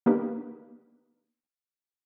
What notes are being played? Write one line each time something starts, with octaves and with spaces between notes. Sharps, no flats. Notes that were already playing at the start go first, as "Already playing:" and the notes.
A#3 B3 D4 D#4 G4 B4